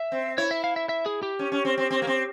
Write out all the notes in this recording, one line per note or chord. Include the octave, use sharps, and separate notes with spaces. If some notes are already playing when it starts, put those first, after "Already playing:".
Already playing: E5
C4
E4 C#5
E5
F5
E5
E5
G#4
G4
C#4
C#4
C4
C4
C4
A#3
C4